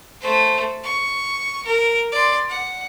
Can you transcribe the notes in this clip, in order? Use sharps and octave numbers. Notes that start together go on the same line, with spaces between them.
A3 C5
C#6
A#4
D5 C6
F#5